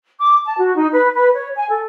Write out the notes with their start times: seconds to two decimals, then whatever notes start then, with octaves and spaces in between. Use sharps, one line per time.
0.20 D6
0.45 A5
0.58 F#4
0.75 D#4
0.92 B4
1.14 B4
1.33 C#5
1.56 G#5
1.69 A4